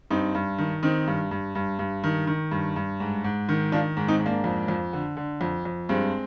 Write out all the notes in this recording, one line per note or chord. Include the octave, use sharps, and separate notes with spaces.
G2 C4 D#4
G2
D#3
D#3 C4 D#4
G2
G2
G2
G2
D#3
D#3
G2
G2
G#2
G#2
D#3
D#3 D4 F4
G#2
C4 D#4
G#2
A#3 D4
F2
F2
D3
D3
F2
F2
G2 G#3 C4